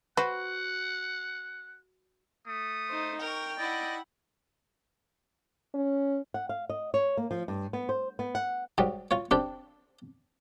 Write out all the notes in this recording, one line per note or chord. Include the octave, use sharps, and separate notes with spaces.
F#4 B4 C5 F#5
A3 D#6
D#4 C5
A#4 G5 C#6
E4 D5 D#5 F#5
C#4
F#5
F5
D#5
C#5
A#3
F3
G2
B3
C5
B3
F#5
G#2 F#3 G3
F4 C#5
C4 D4 G4 A4